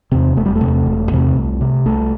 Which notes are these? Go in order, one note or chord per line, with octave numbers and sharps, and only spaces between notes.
E2 C3 C4
E1 A3
G3
A3
E2 C3
E1
E2 C3
C2
C3
C2 A3